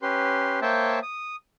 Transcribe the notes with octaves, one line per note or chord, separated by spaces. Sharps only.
C#4 G4 B4 C6
A#3 C5 C#5 E5 G5 A5
D#6